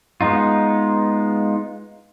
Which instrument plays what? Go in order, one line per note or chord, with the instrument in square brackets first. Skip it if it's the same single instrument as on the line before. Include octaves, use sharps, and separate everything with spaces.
[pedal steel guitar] G#3 B3 D#4 F4